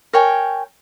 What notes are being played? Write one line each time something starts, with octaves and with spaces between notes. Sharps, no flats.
A#4 C#5 G5 G#5